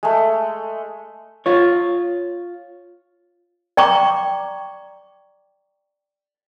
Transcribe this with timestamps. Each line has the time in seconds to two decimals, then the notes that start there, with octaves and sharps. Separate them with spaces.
0.03 G#3 A3
1.46 F4 C#5
3.77 D5 G5 A#5 C#6 D6